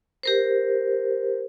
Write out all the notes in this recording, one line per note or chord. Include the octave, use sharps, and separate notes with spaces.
G4 A#4 C5